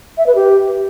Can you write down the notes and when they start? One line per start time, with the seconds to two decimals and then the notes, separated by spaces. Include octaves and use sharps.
0.17 E5
0.26 B4
0.35 G4